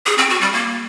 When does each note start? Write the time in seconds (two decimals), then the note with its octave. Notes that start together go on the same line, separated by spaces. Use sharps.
0.06 G#4
0.18 C4
0.29 F#4
0.41 G3
0.53 A#3